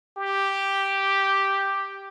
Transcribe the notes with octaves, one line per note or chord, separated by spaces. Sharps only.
G4